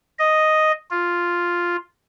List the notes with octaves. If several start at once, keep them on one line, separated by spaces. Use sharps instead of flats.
D#5
F4